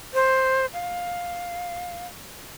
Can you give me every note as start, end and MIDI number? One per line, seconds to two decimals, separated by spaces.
0.14 0.66 72
0.73 2.05 77